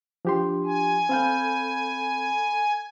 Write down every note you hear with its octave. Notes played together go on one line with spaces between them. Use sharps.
F3 D4 G4 C6
G#5
C4 A4 F5 B5 G6